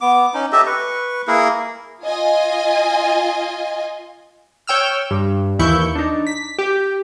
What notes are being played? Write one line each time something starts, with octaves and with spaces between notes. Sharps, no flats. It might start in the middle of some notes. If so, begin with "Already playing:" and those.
B3 D6
C#4 D#4
G4 A4 D#5 E5
B4 C#6
A#3 E4 G#4 A#4
F4 D#5 G#5
C#5 G5 E6 F6
G2
D#2 E3 E4 C#6 G6
D4 D#4
B6
G4